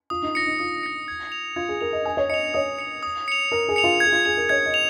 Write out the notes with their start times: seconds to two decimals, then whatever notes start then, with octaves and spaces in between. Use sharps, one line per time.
0.10 F4 D#6
0.22 D#4
0.35 F4 A#6 C#7
0.46 D#4
0.59 F4 D#6
0.83 A#6 C#7
1.08 G#6
1.32 F7
1.56 F4 G#6
1.69 G#4
1.81 A#4 F7
1.93 D#5
2.05 G#5 D#6
2.17 C#5
2.29 D#5 C#7 F7
2.54 C#5 D#6
2.79 C#7 F7
3.03 D#6
3.28 C#7 F7
3.51 A#4 D#6
3.69 G#4
3.76 C#7 F7
3.84 F4
4.00 G#4 G#6
4.12 F4
4.25 G#4 F7
4.37 A#4
4.49 C#5 G#6
4.65 D#5
4.74 F7